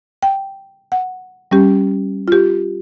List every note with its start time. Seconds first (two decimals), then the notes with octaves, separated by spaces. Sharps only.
0.23 G5
0.92 F#5
1.51 G3 C#4 G4
2.28 F4 G4